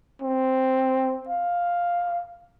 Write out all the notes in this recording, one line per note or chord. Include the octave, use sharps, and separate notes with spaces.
C4
F5